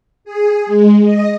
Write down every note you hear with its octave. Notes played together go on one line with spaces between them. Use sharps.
G#4
G#3
D#5